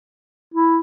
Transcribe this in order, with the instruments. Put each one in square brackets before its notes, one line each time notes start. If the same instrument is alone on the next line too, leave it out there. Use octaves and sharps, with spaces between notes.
[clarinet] E4